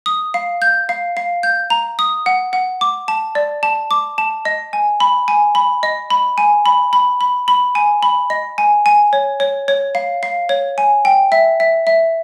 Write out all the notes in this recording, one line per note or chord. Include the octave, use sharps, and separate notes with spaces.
D#6
F5
G6
F5
F5
G6
A#5
D#6
F#5
F#5
D6
A5
D5
A5
D6
A5
D#5
G#5
B5
G#5
B5
D#5
B5
G#5
B5
B5
B5
B5
G#5
B5
D#5
G#5
G#5
C#5
C#5
C#5
F5
F5
C#5
G#5
G5
E5
E5
E5